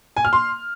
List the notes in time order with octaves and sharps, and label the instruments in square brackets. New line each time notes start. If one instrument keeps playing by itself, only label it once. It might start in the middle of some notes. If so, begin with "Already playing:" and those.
[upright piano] G#5
F6
C6